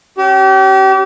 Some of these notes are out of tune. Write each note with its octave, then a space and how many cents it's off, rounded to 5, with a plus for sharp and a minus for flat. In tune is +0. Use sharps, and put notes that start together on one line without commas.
C#4 +0 G4 -35